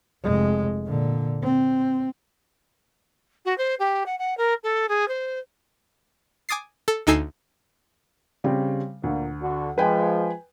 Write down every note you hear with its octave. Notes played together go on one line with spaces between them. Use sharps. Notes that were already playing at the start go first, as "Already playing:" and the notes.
F1 G#3
A#2 D3
C4
F#4
C5
G4
F#5
F#5
A#4
A4
G#4
C5
G#5 D6 D#6 A6 C7
A4
D2 D#4 A4 G#5 E6 C7
C#3 G3 C4
D2 A#2
D3 F#4
F3 G#3 B4 G5 G#5